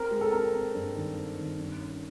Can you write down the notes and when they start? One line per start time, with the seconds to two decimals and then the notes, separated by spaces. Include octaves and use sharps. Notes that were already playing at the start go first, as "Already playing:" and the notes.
Already playing: C4 A#4
0.11 G#3
0.21 A4
0.32 C4 A#4
0.54 C4
0.75 G2
0.95 D#3
1.17 C4
1.38 D#3
1.59 G2
1.81 C#4